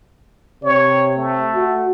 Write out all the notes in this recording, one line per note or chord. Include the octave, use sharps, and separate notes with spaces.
C3 C#5
A3
F#4